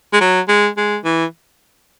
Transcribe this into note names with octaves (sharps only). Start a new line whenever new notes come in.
G#3
F#3
G#3
G#3
E3